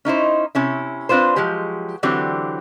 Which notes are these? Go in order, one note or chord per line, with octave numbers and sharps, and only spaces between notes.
C#4 D#4 E4 C5
C3 C#4 E4
C4 D4 F4 B4 C5
F3 F#3 G#3 G4
D3 E3 F#3 C4 G4